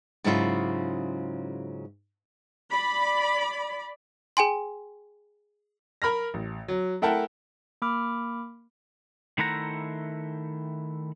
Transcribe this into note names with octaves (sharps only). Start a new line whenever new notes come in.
G#2 C#3 F#3 C#4 E4 F4
D5 B5
G#4 G5 G#5 C6
A#4 B5 F6 A#6
A1
F#3
A3 E4 A#4 F#5 G5 A5
A#3 B5 D6 F6
D#3 A3 E4 C5 F#5 A#5